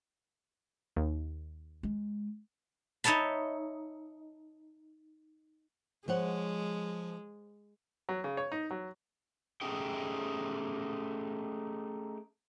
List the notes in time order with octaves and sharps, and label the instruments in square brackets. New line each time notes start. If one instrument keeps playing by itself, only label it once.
[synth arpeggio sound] D#2
[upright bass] G#3
[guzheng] D#4 C#5 E5 A5 B5
[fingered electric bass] F3 [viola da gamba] G#3 [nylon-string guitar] C5 C#5 F#5
[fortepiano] F#3
C#3
C#5
D#4
F#3
[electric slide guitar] A3 C#4 D#4 G4 G#4 G5